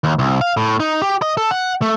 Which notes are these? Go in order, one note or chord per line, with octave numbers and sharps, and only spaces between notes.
D#2
C2
F5
A2
D#4
G4
D#5
A4
F#5
A3